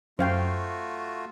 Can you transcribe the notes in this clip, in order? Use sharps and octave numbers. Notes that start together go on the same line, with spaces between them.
F#2 A3 F4 F#4 C5 F5 G5